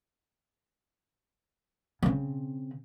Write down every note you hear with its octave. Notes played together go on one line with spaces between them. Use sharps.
C#3 C4